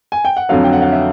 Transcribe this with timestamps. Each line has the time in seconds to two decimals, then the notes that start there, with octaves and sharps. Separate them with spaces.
0.12 G#5
0.25 G5
0.37 F#5
0.49 F2 D3 F#3 F5
0.64 G5
0.73 F#5
0.82 F5
0.92 E5